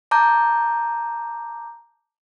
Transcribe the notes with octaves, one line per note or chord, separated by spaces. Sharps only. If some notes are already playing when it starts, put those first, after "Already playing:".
A5 A#5 D6 G6